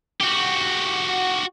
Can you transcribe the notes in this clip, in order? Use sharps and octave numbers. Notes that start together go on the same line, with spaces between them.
F#4 G4